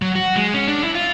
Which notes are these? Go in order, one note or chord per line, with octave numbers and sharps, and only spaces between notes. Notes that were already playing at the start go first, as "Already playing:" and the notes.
F#3
F#4
G#3
C#4
D4
E4
F4